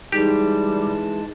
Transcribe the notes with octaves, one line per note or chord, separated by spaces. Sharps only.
E3 G3 G#3 D#4 G4 G#4 A5